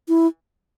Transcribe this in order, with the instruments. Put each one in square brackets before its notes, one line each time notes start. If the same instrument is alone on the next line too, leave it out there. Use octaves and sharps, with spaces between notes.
[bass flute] E4